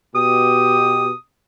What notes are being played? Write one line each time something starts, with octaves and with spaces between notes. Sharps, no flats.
B2 G4 D#6